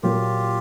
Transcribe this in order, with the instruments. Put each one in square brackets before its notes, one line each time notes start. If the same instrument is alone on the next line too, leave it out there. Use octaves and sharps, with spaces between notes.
[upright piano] A#2 F#3 A#3 [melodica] F4 G4